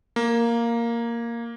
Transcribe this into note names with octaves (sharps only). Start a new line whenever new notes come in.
A#3